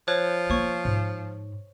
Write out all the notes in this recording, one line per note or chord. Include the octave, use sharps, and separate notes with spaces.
F3 C5 C#5 F#6
A#3 C#5 C#6
G#2